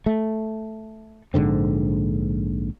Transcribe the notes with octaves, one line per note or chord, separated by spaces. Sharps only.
A3
A#1 G#2 D3 C4